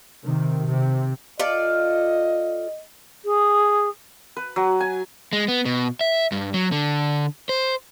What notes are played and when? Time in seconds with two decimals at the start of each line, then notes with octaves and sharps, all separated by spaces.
0.24 C3 D#3
0.67 C3
1.40 F4 A4 D5 D#5
3.25 G#4
4.37 B4
4.56 F#3
4.80 G#5
5.33 G#3
5.48 B3
5.65 B2
6.01 E5
6.32 G2
6.54 F#3
6.72 D3
7.49 C5